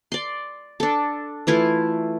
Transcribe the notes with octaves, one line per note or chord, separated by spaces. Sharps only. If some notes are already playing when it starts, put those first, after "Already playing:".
D5 C6
D4 A4
E3 A3 E4 F4